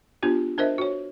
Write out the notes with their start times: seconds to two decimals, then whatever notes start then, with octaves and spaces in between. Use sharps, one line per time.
0.23 B3 D4 F4 G4
0.58 D4 A#4 C5 D#5 E5
0.78 F#4 C#5